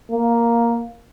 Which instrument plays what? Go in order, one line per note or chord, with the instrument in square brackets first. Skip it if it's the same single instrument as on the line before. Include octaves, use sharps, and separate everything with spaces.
[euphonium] A#3